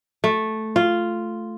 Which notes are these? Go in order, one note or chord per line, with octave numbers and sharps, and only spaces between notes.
A3
F4